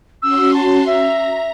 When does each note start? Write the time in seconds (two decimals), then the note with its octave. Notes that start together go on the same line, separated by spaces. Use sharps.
0.22 C#4 F#4 C6 E6
0.54 A5
0.86 E5 A#5